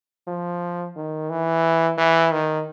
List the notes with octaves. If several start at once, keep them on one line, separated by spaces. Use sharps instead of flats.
F3
D#3
E3
E3
D#3